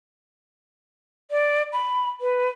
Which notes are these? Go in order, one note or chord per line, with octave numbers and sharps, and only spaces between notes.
D5
B5
B4